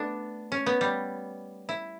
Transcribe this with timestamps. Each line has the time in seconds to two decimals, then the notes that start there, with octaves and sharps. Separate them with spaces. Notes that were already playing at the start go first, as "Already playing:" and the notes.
Already playing: A3 B3 D4
0.52 C#4
0.66 B3
0.81 G3
1.69 E4